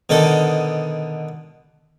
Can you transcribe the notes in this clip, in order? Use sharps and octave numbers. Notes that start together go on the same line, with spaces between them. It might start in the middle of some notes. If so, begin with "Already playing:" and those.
B2 D3 D#3 A4